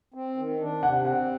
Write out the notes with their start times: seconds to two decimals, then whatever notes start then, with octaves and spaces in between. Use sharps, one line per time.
0.14 C4
0.37 D#3
0.60 D4
0.83 C3 F#5
1.05 C4 F#5